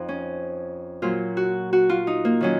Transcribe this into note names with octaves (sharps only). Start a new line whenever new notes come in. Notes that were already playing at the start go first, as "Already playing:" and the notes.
Already playing: F2 F3 D#4
C#4
A#2 F#3 F4
F#4
F#4
F4
D#4
A#3
D#3 F#3 C#4